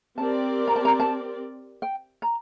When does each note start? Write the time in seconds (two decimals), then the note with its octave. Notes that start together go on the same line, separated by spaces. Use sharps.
0.18 C4 G4 A#4 D5 A5
0.68 A#5
0.76 A5
0.85 A#5
1.00 A5
1.82 G5
2.22 A#5